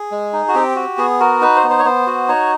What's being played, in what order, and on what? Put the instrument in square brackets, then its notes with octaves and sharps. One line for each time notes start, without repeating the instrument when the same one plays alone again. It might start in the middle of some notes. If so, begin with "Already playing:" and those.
Already playing: [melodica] G#4
G#3
D#4
F#4
C4 G4
F#4
B3 G#4
F#4 A#4
D#4 B4
C5
B3
C5
C#5
B3 C5
F#4
D#4 C#5